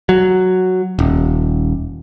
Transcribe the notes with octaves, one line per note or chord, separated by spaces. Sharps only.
F#3
D#1